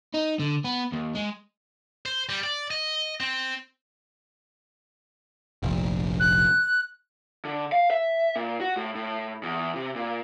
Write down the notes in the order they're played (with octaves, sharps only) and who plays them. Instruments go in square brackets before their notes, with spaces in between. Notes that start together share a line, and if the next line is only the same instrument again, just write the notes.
[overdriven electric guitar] D#4
D3
B3
D#2
G#3
[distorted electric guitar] C5
G3
D5
D#5
C4
[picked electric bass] F1 A#1
[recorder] F#6
[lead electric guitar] D3
F5
E5
A#2
F#4
A2
A2
E2
C3
A#2